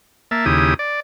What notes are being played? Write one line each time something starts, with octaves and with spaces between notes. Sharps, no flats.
A#3 E5 A5
D#2 C#3 E4 G4 D#6
D5